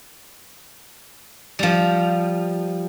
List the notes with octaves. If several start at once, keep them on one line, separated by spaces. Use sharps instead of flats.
F3 G3